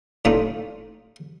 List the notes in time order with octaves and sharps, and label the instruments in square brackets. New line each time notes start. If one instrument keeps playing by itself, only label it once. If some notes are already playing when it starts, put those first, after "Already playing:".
[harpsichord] A2 D4 D#4 F4